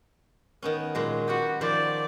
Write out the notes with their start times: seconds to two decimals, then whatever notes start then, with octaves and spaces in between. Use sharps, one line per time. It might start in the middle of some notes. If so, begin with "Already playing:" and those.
0.62 D#3 B3 C#4
0.95 A#2 F#3 G#3
1.28 F#4 G4 B4 F#5
1.61 D#3 F3 C5 D5